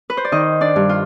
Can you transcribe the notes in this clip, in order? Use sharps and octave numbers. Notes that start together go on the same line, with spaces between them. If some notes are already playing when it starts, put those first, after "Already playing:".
B4
C5
D5
D#3 D#4 D#5
D4 D5
G2
F4